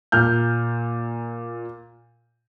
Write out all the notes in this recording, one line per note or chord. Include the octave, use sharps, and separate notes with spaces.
A#2 F6 G6